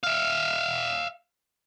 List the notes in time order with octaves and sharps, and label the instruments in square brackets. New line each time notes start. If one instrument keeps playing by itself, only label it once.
[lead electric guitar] E5 F5